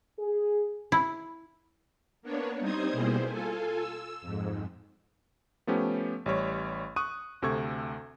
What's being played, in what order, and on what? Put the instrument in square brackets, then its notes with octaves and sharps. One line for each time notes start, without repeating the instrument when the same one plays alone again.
[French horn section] G#4
[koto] E4
[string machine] A#3 B3 D4 C#5
G3 C4 D#4 C5 D#6 G#6
B2 G3 A#3 E4 G#4 C5
F4 A4 G#5
E6
F2 G#2
[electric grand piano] F3 A3 B3 C#4 G4
A1 G3 C#5
C#6 D#6 F#6 D#7
D2 C3 A4 C#6 G#6